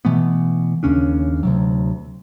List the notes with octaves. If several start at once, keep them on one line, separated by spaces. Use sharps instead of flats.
B2 E3 A3 B3
D#2 C#3 C#4 D4
D2 C3 F#3